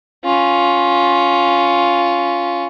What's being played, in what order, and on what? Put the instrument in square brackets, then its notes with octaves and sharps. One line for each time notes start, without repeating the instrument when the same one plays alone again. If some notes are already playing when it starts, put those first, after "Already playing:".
[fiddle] C#4 F4